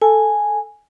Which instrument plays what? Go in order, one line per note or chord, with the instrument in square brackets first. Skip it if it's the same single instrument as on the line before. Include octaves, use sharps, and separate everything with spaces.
[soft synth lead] A4 [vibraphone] G#5